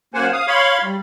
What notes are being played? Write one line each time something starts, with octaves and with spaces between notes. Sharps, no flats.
F#2 A#3 C5 F#5 G#5
F5 D#6
C#5 F5 B5 C6
G3